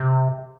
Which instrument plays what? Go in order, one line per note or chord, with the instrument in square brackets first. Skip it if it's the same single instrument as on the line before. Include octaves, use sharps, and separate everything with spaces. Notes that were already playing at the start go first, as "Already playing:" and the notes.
Already playing: [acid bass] C3